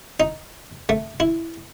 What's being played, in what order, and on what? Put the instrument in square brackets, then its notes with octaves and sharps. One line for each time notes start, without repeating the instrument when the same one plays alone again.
[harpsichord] D#4
A3
E4